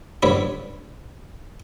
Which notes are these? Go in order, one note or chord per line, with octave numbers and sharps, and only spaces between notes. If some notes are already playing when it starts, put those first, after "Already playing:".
C#2 G2 A3 D4 C#5 B5